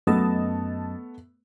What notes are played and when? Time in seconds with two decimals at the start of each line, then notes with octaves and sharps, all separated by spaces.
0.07 F#2 A3 B3 D#5 A5